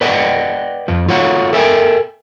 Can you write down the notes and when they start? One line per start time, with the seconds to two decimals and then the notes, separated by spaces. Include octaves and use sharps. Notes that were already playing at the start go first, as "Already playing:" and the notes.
0.01 B4 D5 D#5 F#5 G5
0.88 F2 F3
1.09 F4 F#4 A4 C#5 F5 F#5
1.53 A4 A#4 E5 G5 G#5